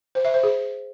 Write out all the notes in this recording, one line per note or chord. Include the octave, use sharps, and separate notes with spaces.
C5
E5
C5
G#4